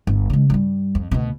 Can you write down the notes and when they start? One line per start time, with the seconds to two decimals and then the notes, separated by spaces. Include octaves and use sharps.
0.07 G1
0.30 C#3 G#3
0.50 G2 G3
0.95 F2
1.11 D2 B2